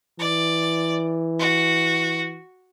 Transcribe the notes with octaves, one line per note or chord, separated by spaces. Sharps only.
E3 D5
F#4